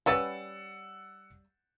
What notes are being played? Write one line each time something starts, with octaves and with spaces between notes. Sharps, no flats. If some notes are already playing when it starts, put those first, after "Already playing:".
G3 C#4 B4 F#5 E6 A6